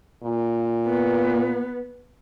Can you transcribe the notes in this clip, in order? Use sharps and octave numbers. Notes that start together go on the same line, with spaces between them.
A#2
B3